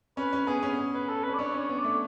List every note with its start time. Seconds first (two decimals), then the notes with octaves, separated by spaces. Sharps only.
0.17 C#4 B4
0.33 C#4
0.47 B3 G#4
0.63 C#4
0.94 B4
1.09 A4
1.24 C#4 B4
1.34 D5
1.39 D4 C#5
1.54 C#4
1.59 C#5
1.69 B3
1.79 D5
1.84 A3